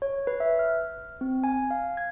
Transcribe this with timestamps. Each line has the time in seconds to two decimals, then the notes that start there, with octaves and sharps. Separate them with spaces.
0.02 C#5
0.27 B4
0.40 E5
0.59 F6
1.21 C4
1.44 G#5
1.71 F5
1.97 G#6